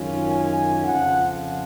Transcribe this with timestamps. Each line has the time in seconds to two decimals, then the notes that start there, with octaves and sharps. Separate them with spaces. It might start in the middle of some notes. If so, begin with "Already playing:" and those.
Already playing: F#2 D#3 G#3 C#4 F4
0.31 G#5
0.84 F2 C#3 F3 F#5